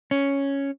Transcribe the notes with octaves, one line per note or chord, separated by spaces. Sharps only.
C#4